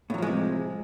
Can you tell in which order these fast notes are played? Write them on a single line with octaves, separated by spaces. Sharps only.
A2 F#3 F3 G#3 C3